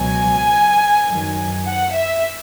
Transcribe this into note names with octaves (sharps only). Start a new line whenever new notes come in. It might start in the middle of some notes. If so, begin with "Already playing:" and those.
Already playing: C#2 B2 F#3 G#5
F#2 D#3 F#3
F#5
E5